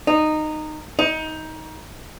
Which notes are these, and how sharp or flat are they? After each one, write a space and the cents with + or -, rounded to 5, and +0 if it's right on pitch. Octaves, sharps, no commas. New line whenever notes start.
D#4 -15
D#4 +20